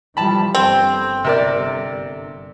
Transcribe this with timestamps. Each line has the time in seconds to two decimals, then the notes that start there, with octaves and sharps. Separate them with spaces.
0.17 E3 F3 G3 A5 B5
0.55 G1 C4
1.24 C3 A#4 D5